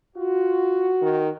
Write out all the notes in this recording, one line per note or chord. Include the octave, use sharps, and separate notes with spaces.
F4 F#4
D#3